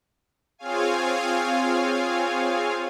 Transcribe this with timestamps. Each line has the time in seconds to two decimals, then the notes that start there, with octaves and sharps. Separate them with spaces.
0.58 C4 F4 G#4 C#5 F5 G#5